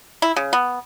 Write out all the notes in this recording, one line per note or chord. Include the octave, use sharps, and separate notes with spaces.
E4
C#3
B3